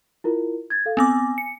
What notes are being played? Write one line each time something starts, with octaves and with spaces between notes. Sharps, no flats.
E4 F4 A#4
G#6 A6
A4 F5
B3 C4 G#5 D6
C#7